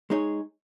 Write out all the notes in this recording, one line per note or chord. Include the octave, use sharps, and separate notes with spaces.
G#3 D#4 G#4 C#5